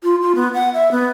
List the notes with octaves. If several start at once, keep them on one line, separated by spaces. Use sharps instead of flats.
F4
F4
B3
F#5
E5
B3